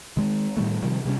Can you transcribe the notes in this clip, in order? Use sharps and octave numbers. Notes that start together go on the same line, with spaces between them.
D#3 G#3
A2 D#3 G3 A3
C3 D#3 F3 G3
C3 G3 A#3 C#4